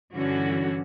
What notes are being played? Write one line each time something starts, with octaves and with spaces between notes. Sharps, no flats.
G2 D3 E3 C#4 F#4